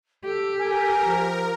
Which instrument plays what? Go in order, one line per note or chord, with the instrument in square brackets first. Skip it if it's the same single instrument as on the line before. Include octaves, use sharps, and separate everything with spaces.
[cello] G4 [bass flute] A4
[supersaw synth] A#4 [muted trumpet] G#5
[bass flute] F3